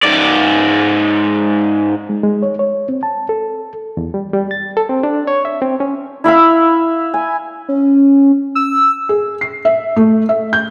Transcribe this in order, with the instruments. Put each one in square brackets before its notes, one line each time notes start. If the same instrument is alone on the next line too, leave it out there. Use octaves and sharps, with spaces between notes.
[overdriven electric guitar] G#2 D5
[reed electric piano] G#3
G#3
C#5
C#5
C4
A5
A4
E2
G3
G3
A6
A4
C4
D4
C#5
E5
C4
C#4
[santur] E4 E5 F5 B5
G#5
[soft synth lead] C#4
E6
[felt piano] G#4
C7
E5
A3
E5
G6